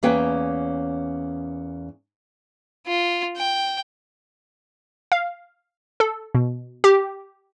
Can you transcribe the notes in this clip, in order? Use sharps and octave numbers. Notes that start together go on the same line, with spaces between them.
E2 A#3 C#4 B4 C#5 G5
F4
G5
F5
A4
B2
G4